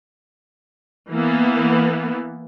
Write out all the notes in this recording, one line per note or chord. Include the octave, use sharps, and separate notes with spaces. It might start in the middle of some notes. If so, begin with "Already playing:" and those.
E3 A#3 B3